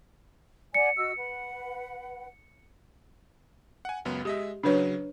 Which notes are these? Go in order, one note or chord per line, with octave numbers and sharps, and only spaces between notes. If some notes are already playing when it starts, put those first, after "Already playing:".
D5 F#5 G#5 C#7
F#4 D#5 E6
B4 F#5
F#5 G#5
C#2 F#2 B3
G#3 G4 D#5 E5
C#3 F#3 D4 B4 C#5